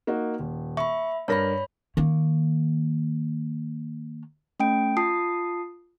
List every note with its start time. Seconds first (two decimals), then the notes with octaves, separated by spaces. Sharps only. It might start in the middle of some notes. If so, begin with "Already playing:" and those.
0.07 A#3 D#4 F#4
0.39 D#1
0.77 E5 B5 C#6
1.28 G2 A#4 C#5 B5 A#6
1.97 D#3 A#3
4.60 A3 C#4 G5 D7
4.97 F4 A5 D#6 C7